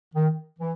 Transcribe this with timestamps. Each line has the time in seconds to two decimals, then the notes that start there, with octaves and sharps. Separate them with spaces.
0.14 D#3
0.59 E3